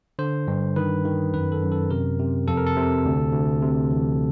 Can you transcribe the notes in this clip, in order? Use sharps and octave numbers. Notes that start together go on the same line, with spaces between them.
D3 C5
G2
D#3 B4
D#3
F#2 B4
A4
F#2
A4
C3 A#4
C3
F2 A4
A#4
A4
C3
D2
D2
C3
E3